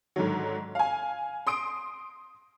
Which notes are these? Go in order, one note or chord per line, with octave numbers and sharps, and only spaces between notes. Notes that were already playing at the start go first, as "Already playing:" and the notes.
G#2 D3 D#3 F#3
F5 G#5
C6 D#6 D7